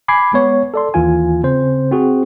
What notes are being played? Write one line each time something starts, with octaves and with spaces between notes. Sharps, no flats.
G#5 B5 D6 G#6 C7
G#3 B3 C#5
A4 D5 C6
D#2 E3 F4 G#5
C#3 C4 C5
C4 F#4 G#4